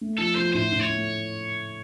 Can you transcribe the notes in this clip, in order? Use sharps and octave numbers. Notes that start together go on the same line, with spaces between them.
A3
F3 A4
F3 C5
A2 C5
A2
C#5
A3